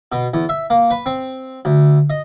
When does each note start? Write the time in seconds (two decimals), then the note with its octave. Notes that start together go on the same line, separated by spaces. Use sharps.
0.12 B2
0.34 E2
0.49 E5
0.70 A#3
0.90 B4
1.06 C4
1.65 D2
2.10 D#5